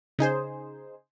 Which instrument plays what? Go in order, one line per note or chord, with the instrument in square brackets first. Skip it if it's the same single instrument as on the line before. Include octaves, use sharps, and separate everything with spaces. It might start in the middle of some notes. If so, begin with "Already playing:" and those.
[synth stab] C#3 D#4 G#4 C5